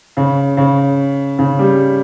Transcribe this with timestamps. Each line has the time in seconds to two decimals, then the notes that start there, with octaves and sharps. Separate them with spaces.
0.17 C#3
0.57 C#3
1.39 C#3
1.59 G3